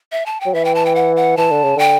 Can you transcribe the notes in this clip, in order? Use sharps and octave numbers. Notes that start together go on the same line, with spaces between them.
E5
A5
G5
F#3
E3 E5
G5
A5
G5
F#5
F#5
E3 A5
D3
C#3
D3 G5